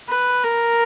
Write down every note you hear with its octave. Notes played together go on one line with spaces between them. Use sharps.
B4
A#4